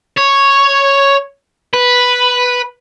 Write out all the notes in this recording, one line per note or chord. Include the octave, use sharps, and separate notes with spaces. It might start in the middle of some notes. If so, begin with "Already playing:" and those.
C#5
B4